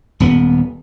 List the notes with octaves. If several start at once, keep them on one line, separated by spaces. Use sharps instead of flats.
D#1 B3